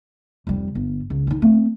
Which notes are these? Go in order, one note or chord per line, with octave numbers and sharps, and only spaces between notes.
F1 G3
G1
C#2
D#3 D#4
A3 C4